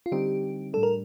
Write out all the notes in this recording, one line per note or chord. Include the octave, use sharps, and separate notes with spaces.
F4
D3 G3 C4 D#4 G4
A2 G3 D4 A4
A#4